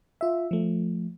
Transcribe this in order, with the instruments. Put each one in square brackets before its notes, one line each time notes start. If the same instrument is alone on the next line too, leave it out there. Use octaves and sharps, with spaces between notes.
[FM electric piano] F4 E5
F3 A3